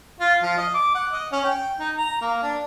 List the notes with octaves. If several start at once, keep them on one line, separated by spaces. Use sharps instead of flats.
F4
F3
D#5
D6
F#5
D#5
C#4
G5
D#4
A#5
A#3
D4